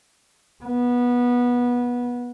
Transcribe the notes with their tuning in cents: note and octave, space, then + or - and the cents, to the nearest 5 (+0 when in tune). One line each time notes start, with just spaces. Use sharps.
B3 -20